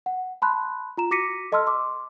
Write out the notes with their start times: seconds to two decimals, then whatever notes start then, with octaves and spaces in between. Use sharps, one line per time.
0.06 F#5
0.42 A5 B5 C6 F#6
0.97 F4 A#5 E7
1.11 F#4 D6 A#6 B6 C#7 D#7
1.52 A4 D#5 A5 C6 E6 F6
1.67 C6 D6